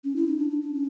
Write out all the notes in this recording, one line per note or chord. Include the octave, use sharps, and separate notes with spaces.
C#4
E4
D#4
D4
D4
D4
C#4